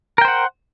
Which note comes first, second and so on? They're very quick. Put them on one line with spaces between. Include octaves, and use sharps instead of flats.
A#4 G5 C5 F#5